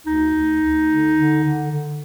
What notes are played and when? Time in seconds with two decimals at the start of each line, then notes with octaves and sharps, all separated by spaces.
0.07 D2 D#4
0.35 D2
0.61 D2
0.90 D3
1.16 D3
1.44 D3
1.71 D3